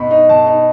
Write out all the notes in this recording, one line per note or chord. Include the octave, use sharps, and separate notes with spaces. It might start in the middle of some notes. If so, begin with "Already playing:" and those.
Already playing: B2 D#4 B5
D#4
B2 A5
D#4